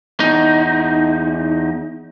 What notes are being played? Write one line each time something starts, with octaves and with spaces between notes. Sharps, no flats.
E2 D#4